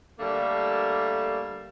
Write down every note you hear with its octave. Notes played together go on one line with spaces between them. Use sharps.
D3 G3 A3 A#3